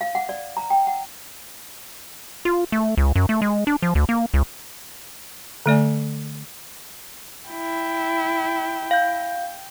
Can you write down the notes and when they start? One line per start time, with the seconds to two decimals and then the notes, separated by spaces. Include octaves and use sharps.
0.01 F5
0.15 F#5
0.29 D5
0.57 A#5
0.70 G5
0.87 F#5
2.45 F4
2.72 A3
2.97 C#2
3.15 F#2
3.29 A3
3.42 G#3
3.67 D4
3.82 F3
3.95 D2
4.09 A#3
4.34 C#2
5.66 D3 A3 D5 G#5
7.50 E4 G5
8.91 F5 G6